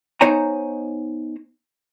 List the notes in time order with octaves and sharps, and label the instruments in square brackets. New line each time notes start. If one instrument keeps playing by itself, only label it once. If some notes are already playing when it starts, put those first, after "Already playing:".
[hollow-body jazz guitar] B3 D#4 C5 C#5 G#5 A#5